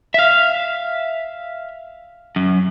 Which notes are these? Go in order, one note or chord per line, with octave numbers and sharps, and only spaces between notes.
E5 F5
F#2